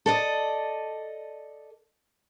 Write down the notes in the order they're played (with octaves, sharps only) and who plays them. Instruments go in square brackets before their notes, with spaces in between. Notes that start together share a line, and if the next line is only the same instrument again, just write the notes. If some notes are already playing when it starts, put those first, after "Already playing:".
[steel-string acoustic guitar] A4 D5 D#5